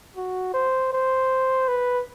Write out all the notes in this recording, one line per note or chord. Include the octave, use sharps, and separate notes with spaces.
F#4
C5
C5
B4